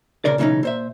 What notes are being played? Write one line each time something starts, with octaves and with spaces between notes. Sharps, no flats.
A#2 C#3 A#4 D5
B1 C#3 E3 C4 C#4 D#4
A#2 C5 E5